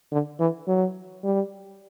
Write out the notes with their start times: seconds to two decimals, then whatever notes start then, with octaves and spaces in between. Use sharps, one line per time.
0.12 D3
0.39 E3
0.68 F#3
1.24 G3